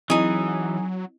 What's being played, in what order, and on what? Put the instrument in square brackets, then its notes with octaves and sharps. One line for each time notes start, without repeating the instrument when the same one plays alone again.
[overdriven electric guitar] E3 [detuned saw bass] F#3 [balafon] C4 E4 D#5 [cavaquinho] D#4 G#4